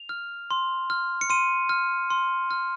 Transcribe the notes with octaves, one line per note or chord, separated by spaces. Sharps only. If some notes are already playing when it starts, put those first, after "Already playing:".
Already playing: F7
F6
C6
F6
C#7
C6 D#7
F6
C6
F6